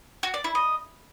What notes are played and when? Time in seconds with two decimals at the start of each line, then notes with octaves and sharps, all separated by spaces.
0.23 F#4
0.34 D5
0.44 E4
0.55 D#5